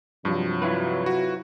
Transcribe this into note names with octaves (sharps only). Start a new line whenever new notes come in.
G2 C3 F3 F#3
E4 F4 B4
F#4